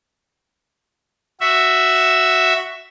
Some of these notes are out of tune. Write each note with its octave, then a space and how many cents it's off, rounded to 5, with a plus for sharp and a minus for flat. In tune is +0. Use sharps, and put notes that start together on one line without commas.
F#4 +0 E5 +0